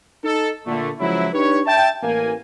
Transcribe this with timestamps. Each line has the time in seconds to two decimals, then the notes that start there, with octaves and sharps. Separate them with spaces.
0.24 D#4 A4
0.66 A#2 D3 A3
1.00 C#2 F3 F#3 E4
1.33 D4 D#4 G4 B4 C#5
1.67 E5 G5 A5
2.02 A1 A#3 G#5